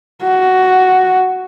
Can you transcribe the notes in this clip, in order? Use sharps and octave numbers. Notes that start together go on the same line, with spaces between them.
F#4